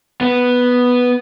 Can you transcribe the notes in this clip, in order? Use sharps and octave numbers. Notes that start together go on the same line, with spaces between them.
B3